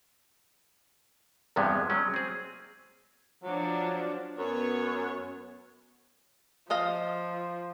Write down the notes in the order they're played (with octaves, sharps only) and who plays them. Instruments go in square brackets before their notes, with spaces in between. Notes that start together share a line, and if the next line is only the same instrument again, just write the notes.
[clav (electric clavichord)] E2 G2 C3 F3 G#3 B3
F#3 G#3 C#4
C4 G#4
[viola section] F3 D4 [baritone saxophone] F#3
[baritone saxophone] F#2 [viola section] B3 C#5
[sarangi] F3 [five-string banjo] A4 D#5 F5